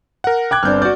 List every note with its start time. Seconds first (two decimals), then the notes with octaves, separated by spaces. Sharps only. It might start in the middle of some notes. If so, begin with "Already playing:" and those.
0.24 A#4 F#5
0.51 G5 D6 F#6 G#6
0.63 G1 C4 D4 F6 G6
0.82 F#4 D5 G6